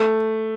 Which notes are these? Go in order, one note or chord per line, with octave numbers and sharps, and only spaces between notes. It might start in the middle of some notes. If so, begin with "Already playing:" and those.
Already playing: A3